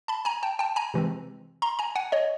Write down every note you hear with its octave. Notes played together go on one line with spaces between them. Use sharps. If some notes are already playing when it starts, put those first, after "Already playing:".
A5 B5
G#5 A#5
G5 A5
G5 A5
G#5 A#5
C3 E3 G#3 C4
A#5 C6
G#5 A#5
F#5 G#5
C#5 D#5